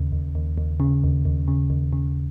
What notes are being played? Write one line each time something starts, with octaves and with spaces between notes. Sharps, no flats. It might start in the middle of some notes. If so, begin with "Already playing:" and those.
Already playing: D#2 C#3
D#2
D#2
D#2
C#3
D#2
D#2
C#3
D#2
C#3